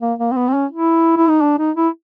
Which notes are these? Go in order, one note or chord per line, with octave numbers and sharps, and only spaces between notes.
A#3
A#3
C4
B3
C4
C#4
E4
E4
D#4
D4
D#4
E4